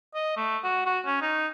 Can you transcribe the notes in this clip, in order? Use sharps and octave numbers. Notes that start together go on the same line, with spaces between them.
D#5
A3
F#4
F#4
C#4
D#4